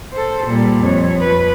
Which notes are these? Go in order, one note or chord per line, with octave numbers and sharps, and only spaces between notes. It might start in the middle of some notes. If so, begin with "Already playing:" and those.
A4 C5
A#2 G3
F2 C#5
F3 B4